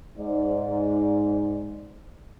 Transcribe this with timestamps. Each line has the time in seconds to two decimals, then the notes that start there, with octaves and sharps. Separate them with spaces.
0.17 G#2 D5